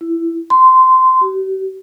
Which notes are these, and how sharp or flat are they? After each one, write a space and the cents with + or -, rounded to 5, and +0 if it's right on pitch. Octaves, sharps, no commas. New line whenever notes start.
E4 +15
C6 -15
G4 -45